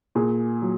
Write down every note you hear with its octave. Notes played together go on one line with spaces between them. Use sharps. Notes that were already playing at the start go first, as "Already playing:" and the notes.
A#2 G#4
F#3